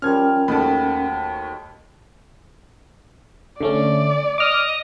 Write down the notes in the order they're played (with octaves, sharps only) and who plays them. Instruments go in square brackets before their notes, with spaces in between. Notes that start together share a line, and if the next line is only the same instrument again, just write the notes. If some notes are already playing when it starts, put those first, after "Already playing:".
[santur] F3 G3 [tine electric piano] C#4 A#4 [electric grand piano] F6 G#6
[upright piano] D#2 A3 A5 [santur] F#4 D#5 G5 [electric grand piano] B5
[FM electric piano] D3 A3 C#4 [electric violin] D5
[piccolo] D#5 [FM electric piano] D6 F6